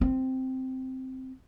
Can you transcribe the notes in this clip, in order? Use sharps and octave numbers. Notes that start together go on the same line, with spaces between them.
C4